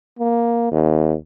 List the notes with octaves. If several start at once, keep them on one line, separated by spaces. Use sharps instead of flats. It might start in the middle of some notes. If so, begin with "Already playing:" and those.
A#3
D#2